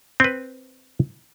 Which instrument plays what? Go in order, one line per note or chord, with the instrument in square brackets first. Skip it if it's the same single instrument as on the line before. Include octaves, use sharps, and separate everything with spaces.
[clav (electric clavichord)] C4 B4